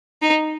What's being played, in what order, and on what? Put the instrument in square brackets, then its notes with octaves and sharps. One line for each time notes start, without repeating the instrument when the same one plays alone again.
[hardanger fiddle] D#4